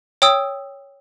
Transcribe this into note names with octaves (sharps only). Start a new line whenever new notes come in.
C#5 G5 D#6 E6